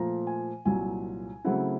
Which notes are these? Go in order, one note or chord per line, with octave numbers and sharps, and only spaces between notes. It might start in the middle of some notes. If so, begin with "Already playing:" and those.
Already playing: A#2 F3 A3 A#5
G#5
C2 A#2 F#3 G#5
C#3 F#3 A3 C4 E4 F#5